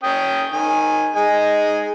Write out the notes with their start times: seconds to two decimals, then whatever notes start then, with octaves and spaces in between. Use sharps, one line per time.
0.03 C#4 G5 D#6
0.53 D#3 G#5
1.16 G#3 D#4 G#5